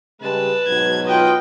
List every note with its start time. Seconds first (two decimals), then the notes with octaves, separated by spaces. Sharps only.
0.21 C#3 G3 G#3 B4 A5
0.67 G#2 B2 F#3 G#6
1.06 F4 B4 D#5 G5